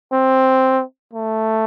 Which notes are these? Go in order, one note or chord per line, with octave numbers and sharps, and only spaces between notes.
C4
A3